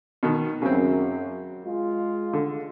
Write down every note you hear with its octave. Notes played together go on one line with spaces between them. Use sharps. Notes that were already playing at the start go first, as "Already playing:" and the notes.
B2 D#3
F#2 C#3 C4
G#3 F4
D3